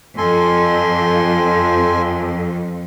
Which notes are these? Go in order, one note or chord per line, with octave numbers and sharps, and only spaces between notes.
F2 A4 G#5 C6